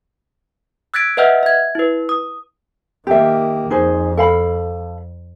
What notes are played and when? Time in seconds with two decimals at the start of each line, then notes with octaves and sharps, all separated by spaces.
0.94 E6 F#6 G#6 A6 B6 D7
1.17 B4 D#5 E5 F#5 F6 G6
1.43 E5 G#6
1.75 E4 B4
2.09 D#6
3.07 D#3 A#3 G4 E5
3.70 F2 D#4 G#4 C5
4.17 A4 F5 B5